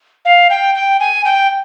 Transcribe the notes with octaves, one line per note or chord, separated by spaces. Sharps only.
F5
G5
G5
G#5
G5